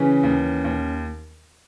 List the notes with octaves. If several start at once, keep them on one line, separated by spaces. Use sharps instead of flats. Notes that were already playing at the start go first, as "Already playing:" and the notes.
Already playing: C#3 E3 C#4
D#2
D#2